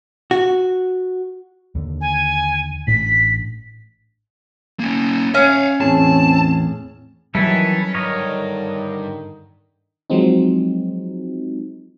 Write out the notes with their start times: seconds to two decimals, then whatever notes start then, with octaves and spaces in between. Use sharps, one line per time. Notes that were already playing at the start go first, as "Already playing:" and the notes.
0.31 F#4
1.75 D#2 D3
2.00 G#5
2.87 A1 A2 D4 B6
4.79 A#3 C#4
5.35 C#4 C#5 E5 F5
5.81 E2 A2 C4 G#4 A5
7.35 D#3 E3 F#3 G3 C#4 E4 A4
7.94 G2 D3 D#3 A#4 C#5 D#5
10.10 F3 F#3 G#3 C4 D#4